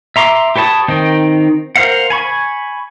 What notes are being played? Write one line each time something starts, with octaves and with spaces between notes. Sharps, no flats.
E5 A#5 C6 D6
G4 B4 C#5 A5 D#6
D#3 C4 D#4
A#4 C5 F5 F#5
G#5 B5 C#6